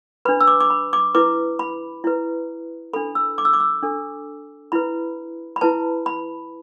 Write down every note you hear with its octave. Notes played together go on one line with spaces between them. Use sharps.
D4 B4 B5
E6
D6
D6
B5
D6
E4 B4 D6
B5
E4 B4
D4 A4 B5
E6
D6
E6
D6
E6
D4 A4
E4 B4 B5
B5
E4 B4 A5
B5